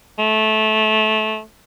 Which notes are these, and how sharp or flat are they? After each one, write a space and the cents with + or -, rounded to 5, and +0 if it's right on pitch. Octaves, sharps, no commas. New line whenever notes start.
A3 -20